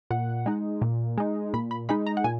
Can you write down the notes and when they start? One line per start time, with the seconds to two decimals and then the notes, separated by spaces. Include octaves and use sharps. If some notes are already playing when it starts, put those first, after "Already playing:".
0.11 A#2 F#5
0.46 G#3 D#4
0.81 A#2
1.18 G#3 D#4
1.54 A#2 B5
1.71 B5
1.89 G#3 D#4 B5
2.06 A#5
2.17 F#5
2.24 A#2 G#5